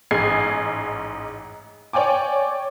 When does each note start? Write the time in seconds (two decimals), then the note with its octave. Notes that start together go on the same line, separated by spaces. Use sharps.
0.11 A1 G#2 G#4 G#6 C7
1.93 C#5 D5 G5 G#5 D6